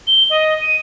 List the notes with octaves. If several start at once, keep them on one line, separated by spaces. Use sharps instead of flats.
G7
D#5
D#7